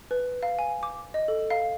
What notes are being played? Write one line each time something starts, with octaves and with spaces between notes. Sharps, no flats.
B4
F5
G#5
D6
D#5
A4
F5